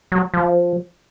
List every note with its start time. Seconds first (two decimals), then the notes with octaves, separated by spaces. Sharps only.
0.12 F#3
0.34 F3